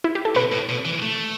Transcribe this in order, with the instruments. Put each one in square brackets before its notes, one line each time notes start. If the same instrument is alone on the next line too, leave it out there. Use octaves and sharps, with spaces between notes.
[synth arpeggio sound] E4
G4
A4
[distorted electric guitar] B2 [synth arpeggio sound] B4
[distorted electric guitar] A2
B2
E3
A3